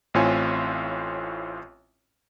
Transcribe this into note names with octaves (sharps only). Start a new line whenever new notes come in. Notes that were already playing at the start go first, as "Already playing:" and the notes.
A1 A2 C4 F4 C#5 G#5